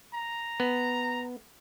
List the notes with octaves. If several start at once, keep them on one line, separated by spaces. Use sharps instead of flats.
A#5
B3